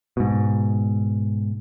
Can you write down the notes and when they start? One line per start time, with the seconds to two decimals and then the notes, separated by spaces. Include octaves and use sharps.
0.17 G#2 B2